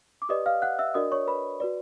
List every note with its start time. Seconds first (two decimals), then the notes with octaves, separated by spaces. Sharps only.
0.22 D6
0.29 G4 B4 D5 D#5 D#6
0.46 F5 F6
0.62 F#5 F#6
0.79 E5 E6
0.94 D4 F#4 A#4 D5 D#5 D#6
1.12 C#5 C#6
1.27 B4 B5
1.60 F#4 B4 D5